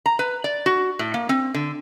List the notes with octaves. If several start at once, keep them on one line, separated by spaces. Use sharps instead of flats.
A#5
B4
D5
F#4
A2
A#3
C4
D3